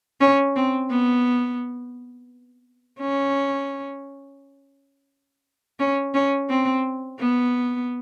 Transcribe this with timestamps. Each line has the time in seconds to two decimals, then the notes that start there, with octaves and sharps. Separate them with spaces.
0.21 C#4
0.56 C4
0.90 B3
3.00 C#4
5.79 C#4
6.14 C#4
6.49 C4
7.19 B3